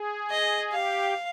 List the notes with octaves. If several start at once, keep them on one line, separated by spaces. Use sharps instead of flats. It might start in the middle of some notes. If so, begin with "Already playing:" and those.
Already playing: G#4
D#5
G4 F5